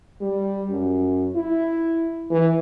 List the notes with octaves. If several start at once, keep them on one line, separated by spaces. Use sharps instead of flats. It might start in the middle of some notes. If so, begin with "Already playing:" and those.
G3
F#2
E4
E3